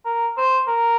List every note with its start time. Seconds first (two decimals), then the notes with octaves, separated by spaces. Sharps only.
0.05 A#4
0.37 C5
0.68 A#4